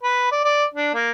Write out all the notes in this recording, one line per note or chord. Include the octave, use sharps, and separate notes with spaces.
B4
D5
D5
D4
A#3